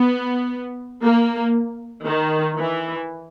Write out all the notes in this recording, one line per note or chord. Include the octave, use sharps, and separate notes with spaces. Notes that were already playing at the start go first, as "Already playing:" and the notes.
Already playing: B3
A#3
D#3
E3